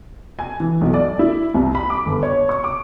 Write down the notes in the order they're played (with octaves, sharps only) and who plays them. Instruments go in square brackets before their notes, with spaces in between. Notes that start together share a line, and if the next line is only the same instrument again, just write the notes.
[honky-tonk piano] G#5
E3
B1
D5
E4
C2
B5
D6
G1
C#5
C#6
D6